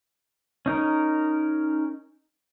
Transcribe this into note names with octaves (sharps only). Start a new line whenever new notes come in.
C#4 D#4 A#4